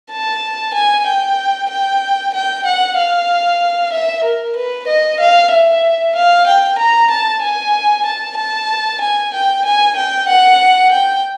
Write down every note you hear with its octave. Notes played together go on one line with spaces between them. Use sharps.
A5
G#5
G5
G5
G5
F#5
F5
E5
A#4
B4
D#5
F5
E5
F5
G5
A#5
A5
G#5
A5
A5
G#5
G5
G#5
G5
F#5
G5